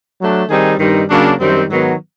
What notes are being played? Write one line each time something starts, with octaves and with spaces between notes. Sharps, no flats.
F#3 A3 D4
D#3 G3 C4 D#4 G#4
G2 D#3 G3 C4 D#4
C#3 F#3 A#3 D4
F#2 D#3 G3 C4
G#2 D#3 F#3 B3